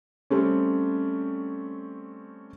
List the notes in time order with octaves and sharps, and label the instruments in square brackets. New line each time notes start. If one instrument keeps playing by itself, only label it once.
[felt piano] G3 A3 C4 C#4